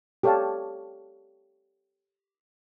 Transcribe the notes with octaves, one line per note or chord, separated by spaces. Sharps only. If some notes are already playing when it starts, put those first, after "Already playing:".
G4 A4 C#5 D5 F5 A5